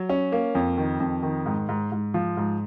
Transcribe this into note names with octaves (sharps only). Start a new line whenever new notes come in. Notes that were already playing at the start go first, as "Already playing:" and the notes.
Already playing: F#3
C#4
A#3
F2
D#3
F2
D#3
G#2
G#2
G#2
F3
G#2